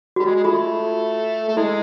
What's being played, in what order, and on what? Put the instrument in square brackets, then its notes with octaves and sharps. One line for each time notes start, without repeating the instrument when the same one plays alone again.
[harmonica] G3 [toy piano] F#4
[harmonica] G#3
G#3
[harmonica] A3 [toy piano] F4
[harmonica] A3
[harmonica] G#3 [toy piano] E4